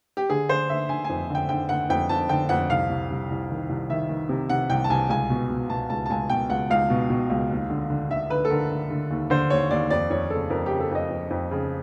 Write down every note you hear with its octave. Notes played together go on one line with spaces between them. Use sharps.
G4
D3 G#4
D3 C5
D3 E5
D3 G#5
G#5
F2
D3 G5
D3 G5
D3 F#5
F2 G5
F2 A5
D3 G5
F2 F#5
C2 F5
C2
C2
C2
D#3
C2
D#3 E5
D#3
C3
C3 F#5
C2 G5
A5
C2 G#5
C#2 G#5
B2
B2
B2 A5
C#2 A5
A5
C#2 G#5
B2 G5
C#2 F#5
C#2 F5
B2
B2
C#2
D#2
D3
D3
D3 E5
D3 B4
A4
D3 A#4
D3
D3
D#2
D3 C5
D#2 C#5
D#2 D5
F2 D5
F2 C#5
C#3 A4
F2 A#4
C#3 G4
A4
F2 D#5
F2
F2
C#3